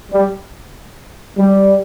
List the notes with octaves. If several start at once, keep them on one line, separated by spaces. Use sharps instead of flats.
G3
G3